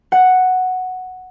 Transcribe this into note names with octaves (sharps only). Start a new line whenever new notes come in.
F#5